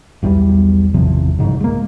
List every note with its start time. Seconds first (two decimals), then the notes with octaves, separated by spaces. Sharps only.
0.22 B1 E2 F3 G3
0.94 G#1 E2 C3 F3
1.39 F1 C2 G#2 C#3
1.60 G#3 A#3